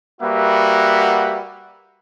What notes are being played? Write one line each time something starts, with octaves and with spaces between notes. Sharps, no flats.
G3 A#3 F#4 B4 E5 F#5